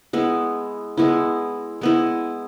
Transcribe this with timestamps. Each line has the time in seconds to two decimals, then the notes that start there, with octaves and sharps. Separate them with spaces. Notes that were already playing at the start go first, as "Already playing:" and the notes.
0.13 G#3 B3 E4
0.97 G#3 B3 E4
1.81 G#3 B3 E4